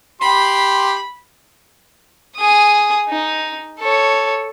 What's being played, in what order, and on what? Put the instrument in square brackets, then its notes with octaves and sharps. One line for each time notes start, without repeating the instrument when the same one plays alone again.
[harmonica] G4 C6 [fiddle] B5
[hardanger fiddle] G#4 D#6
D#4
A4 C#5